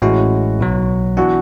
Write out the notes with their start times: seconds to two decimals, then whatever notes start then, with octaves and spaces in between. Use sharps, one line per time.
0.02 A1 A2 G#3 C#4 E4 F#4
0.60 B1 B2 F#3
1.17 E3 B3 D4 F#4